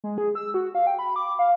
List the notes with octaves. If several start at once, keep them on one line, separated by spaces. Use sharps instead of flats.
G#3
G#4
E6
F#4
F5
G5
B5
D6
F5